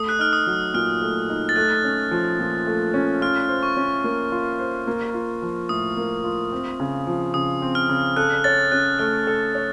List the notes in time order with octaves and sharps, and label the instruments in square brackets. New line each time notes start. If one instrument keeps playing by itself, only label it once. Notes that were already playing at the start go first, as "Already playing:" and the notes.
Already playing: [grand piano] A3 [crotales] D#6
[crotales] F#6
[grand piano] D#4 [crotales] F6
[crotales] D#6
[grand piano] F#3
[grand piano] A#2 [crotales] F6
[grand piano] A3
D#4
[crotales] A6
[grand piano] A3 [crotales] F#6
[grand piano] C#4
F3
A#2
A3
C#4
[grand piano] F4 [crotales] F6
[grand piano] C5
[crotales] C#6
[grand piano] C#4
A#3
F4
C5
A#3
F4
F3
[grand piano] A2 [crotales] D#6
[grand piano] A#3
F4
C4
C#3
F3
[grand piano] C#3 [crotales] D#6
[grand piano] C4
[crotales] F6
[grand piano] C#3
[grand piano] A4 [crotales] F#6
[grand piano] C#5 [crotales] A6
[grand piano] C#4 [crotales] F#6
[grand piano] A3 [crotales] F6
[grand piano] A4
C#5